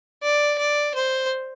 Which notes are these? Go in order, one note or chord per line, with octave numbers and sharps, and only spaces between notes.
D5
D5
C5